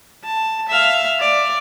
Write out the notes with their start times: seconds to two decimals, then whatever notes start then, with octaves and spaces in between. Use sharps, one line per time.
0.24 A5
0.68 E5 F5
1.20 D5